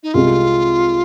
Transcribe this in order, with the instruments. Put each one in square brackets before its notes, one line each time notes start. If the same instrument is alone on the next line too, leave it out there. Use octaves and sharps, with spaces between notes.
[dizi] D#4
[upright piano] C2 C3 G#3 [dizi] F4